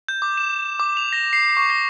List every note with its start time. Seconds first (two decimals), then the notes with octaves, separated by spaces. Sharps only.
0.08 G6
0.22 D6
0.37 E7
0.80 D6
0.97 F7
1.13 A#6
1.33 C7
1.57 C#6
1.70 A#6